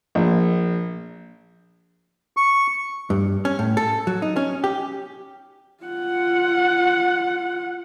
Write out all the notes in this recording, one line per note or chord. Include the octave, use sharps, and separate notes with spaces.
A#1
C#6
G2
C#4
A2
A4
F#3
D#4
C#4
G4
F4 F#5